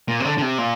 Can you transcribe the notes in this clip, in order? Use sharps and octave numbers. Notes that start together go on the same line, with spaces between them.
A#2
C3
D3
D3
C3
A#2